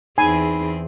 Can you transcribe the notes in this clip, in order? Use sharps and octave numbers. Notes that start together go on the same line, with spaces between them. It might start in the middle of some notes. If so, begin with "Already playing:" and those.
E2 C4 D#4 G#4 G#5 B5 C7